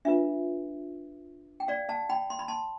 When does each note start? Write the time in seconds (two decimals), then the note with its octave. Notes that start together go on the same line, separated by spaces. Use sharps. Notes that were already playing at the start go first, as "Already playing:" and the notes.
0.05 D4 F4 B4 E5
1.60 G5
1.68 D5 F5
1.89 F5 A5
2.09 G5 B5
2.30 C6
2.39 B5
2.48 A5 C6